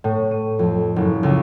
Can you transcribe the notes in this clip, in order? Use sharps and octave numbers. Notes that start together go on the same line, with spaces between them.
A2
D#7
F2
F#1
C#2